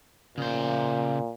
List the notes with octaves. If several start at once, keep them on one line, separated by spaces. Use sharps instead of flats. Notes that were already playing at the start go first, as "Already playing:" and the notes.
A#2 C#3 C5